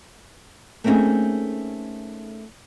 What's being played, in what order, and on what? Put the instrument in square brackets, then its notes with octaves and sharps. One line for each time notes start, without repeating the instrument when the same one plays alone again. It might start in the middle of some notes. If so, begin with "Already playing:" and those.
[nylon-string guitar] A3 A#3 C4 C#4 D#4 G#4